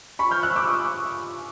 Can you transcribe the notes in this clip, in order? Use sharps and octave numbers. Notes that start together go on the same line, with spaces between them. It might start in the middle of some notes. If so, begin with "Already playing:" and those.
B5 C#6
F6 G6
E6 F#6
D6 E6
C#6 D#6